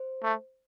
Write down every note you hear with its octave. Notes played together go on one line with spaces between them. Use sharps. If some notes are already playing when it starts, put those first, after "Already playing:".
Already playing: C5
A3